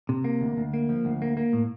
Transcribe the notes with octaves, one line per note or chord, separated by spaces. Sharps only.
C3
A#3
D2
D2
A#3
F3
D2
A#3
A#3
A2